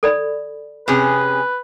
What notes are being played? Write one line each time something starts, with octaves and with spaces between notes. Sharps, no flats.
A4 D5 B5
C3 C#4 G#4 B4